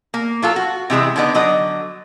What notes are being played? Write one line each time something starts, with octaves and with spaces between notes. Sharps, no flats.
A#3
F#3 F4 A4
F#4
C3 E3 G#3 C4
D3 B3 D#4
D3 F#3 D#5